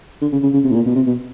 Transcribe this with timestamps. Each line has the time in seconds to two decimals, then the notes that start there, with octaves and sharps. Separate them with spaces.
0.21 D3
0.32 C#3
0.43 C#3
0.53 C#3
0.64 C3
0.70 A2
0.75 A#2
0.86 B2
0.95 C3
1.06 B2